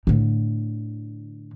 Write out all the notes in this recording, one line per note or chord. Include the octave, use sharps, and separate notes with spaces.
A2 D3